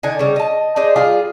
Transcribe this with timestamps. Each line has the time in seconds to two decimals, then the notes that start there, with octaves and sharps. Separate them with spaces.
0.03 D3 D#4 G#5
0.19 C#3 G3
0.36 D#5 A5
0.76 D#4 G#4 C5 D5
0.96 G3 F4 G#4